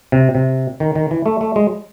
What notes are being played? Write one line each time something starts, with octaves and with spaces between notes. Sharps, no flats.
C3
C3
D#3
D#3
E3
A3
A3
G#3